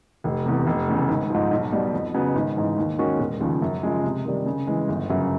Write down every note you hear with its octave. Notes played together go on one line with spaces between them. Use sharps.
F1
E2 C3
F1
E2 C#3
G#1
G#2 F3
B1
B2 G3
F2
C#3 F#3 B3
G#1
G#2 E3
D#2
D#3 G#3 C#4 F#4
E1
D#2 C#3 F3
F#2
C#3 F3 G#3
C3
D#3 G3
C#3
E3 G#3
G1
F#2 C#3 F#3